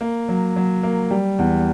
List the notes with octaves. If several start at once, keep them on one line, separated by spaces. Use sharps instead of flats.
A#3
F#3
F#3
A#3
G3
E2